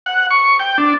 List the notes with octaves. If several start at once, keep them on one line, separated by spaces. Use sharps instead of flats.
F#5
C#6
G5
D4